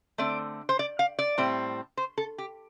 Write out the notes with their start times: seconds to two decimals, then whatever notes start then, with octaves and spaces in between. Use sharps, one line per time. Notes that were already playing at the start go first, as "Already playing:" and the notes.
0.18 D3 A3 C4 D5
0.69 C5
0.79 D5
0.99 F5
1.19 D5
1.38 A2 G3 C4
1.97 C5
2.18 A4
2.38 G4